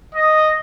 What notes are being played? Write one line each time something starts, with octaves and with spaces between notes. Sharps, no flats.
D#5